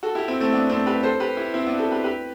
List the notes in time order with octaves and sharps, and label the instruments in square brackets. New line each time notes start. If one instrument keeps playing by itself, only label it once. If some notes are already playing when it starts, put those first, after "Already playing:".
[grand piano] F#4 A4
E4 G4
C4 E4
A3 C4
B3 D4
A3 C4
G4 B4
A4 C5
G4 B4
E4 G4
C4 E4
B3 D4
F#4 A4
G4 B4
G4 B4